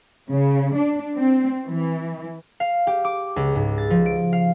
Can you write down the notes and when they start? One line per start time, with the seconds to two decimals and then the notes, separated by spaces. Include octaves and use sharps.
0.30 C#3
0.76 D4
1.17 C4
1.67 E3
2.60 F5
2.87 G4
3.04 D6
3.36 C#2
3.55 G#2
3.78 A6
3.90 F3
4.06 D7
4.33 F5